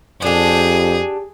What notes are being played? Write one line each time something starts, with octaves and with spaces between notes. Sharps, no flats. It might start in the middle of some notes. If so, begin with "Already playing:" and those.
F2 D4 G4 G#4